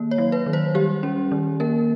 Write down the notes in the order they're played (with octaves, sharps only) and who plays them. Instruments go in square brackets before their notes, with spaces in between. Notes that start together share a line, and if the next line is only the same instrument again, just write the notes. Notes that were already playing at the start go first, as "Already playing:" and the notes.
Already playing: [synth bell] D#3 A#3
C#5
F#3
B4
D#3
C5
G3 G4
C#4
D#3
A#3 A#4